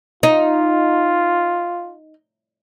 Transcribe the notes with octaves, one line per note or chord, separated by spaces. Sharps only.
D#4 F4